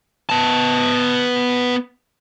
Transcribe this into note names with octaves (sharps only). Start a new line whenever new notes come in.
B3 A5